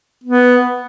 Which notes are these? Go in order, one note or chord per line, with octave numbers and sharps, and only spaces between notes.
B3